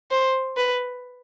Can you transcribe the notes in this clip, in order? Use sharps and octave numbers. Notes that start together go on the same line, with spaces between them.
C5
B4